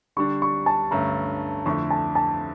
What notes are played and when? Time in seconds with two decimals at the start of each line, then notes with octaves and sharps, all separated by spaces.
0.16 D3 G3 D4 C#6
0.42 C#6
0.66 A5
0.91 G2 D3 A3 C#4 A#5
1.66 F2 D3 A3 E4 C#6
1.90 A5
2.15 A5